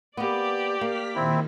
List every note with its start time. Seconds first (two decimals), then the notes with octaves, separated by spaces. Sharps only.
0.17 A#3 B3 G4 D5
0.81 A#3 F6 B6
1.15 A#2 D#3 C4 E4